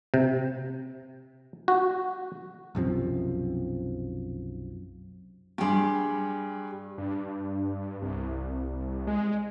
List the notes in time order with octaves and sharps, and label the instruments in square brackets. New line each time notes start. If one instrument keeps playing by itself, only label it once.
[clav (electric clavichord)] C3
F#4
[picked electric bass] B1 F#2 C3 F3
[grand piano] G2 G#4 C6 [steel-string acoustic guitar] G3 G4
[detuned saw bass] G2
C2
G#3